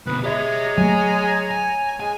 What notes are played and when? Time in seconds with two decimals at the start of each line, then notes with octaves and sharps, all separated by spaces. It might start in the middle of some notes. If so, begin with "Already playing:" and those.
0.06 D2 B2 B4 B5 D#6
0.24 G#3 G4 C#5 E5 A#5 G#6
0.78 F#3 A3 G#5
1.51 G#5
2.00 G#3 G#5